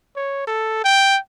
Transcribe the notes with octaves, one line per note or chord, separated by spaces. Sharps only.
C#5
A4
G5